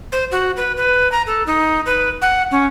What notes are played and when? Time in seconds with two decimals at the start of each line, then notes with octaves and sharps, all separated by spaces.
0.12 C5
0.31 F#4
0.57 B4
0.77 B4
1.12 A#5
1.26 A4
1.46 D#4
1.86 B4
2.22 F#5
2.51 C#4